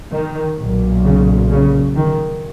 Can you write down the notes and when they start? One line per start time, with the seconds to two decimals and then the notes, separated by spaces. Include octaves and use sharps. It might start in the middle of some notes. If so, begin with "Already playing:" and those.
0.12 D#3
0.58 B1 A#2
1.04 C#3
1.50 C#3
1.95 D#3